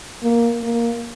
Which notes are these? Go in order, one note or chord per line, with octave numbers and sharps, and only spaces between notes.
A#3
A#3